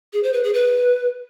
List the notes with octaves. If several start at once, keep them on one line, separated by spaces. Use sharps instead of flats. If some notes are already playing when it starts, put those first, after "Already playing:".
G#4
C5
B4
G#4
B4